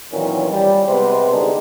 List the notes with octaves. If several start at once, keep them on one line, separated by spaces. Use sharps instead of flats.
A#2 D#3 E3 F#3 C4 C#4
G3
C3 G#3 B3 B4 C5
C2 G2 D3 G#3 D4 D#4